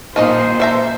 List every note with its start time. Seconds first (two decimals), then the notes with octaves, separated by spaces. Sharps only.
0.16 A#2 F3 D#4 C5 D#5
0.60 A4 E5 A#5